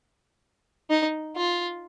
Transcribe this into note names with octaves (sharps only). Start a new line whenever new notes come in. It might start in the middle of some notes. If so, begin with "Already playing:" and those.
D#4
F4